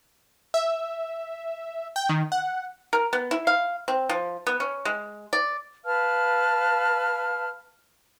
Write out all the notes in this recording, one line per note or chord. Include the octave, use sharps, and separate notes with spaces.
E5
G5
D#3
F#5
A#4
B3
E4
F5
C4
F3
B3
C#4
G#3
D5
B4 F5 A5 F6